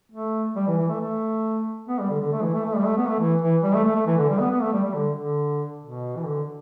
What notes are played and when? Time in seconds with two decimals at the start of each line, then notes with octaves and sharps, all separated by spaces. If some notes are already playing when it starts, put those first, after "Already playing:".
0.12 A3
0.56 G3
0.67 E3
0.78 E3
0.89 A3
1.00 A3
1.88 B3
1.99 G3
2.09 D3
2.21 D3
2.32 A3
2.42 E3
2.53 A3
2.65 A3
2.76 G3
2.86 A3
2.97 B3
3.08 A3
3.19 E3
3.42 E3
3.63 G3
3.74 A3
3.84 A3
3.95 A3
4.06 E3
4.18 D3
4.29 G3
4.40 B3
4.50 B3
4.62 A3
4.73 G3
4.84 G3
4.95 D3
5.16 D3
5.83 B2
6.16 E3
6.25 D3